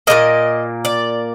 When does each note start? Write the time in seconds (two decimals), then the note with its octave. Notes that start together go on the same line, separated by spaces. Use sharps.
0.07 A#2 G3 A#3 D#5
0.85 D5